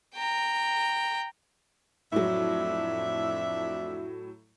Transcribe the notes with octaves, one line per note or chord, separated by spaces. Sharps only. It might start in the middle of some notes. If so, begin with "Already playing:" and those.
G5 A#5
F2 A2 F#3 D4 E5